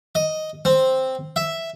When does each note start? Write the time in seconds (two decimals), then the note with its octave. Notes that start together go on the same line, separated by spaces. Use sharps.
0.15 D#5
0.65 C4
1.36 E5